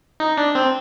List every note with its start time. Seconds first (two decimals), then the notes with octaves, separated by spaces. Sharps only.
0.20 D#4
0.38 D4
0.55 C4